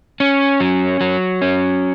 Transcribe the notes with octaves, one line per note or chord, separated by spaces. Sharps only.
C#4
F#3
F#3
C#4